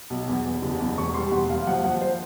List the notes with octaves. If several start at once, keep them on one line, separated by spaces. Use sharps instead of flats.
B1
E2
E2
F#1
E2
E1 C#6
G3 C6
E1 F#5
D#2 F5
F5
F3 F#5
F3 F#5
C5